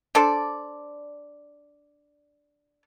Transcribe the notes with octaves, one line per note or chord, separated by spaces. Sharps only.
D4 A4 C5 D5